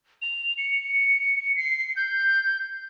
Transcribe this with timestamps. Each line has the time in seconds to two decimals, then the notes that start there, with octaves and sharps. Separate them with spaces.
0.22 F7
0.58 C#7
1.56 C7
1.96 G6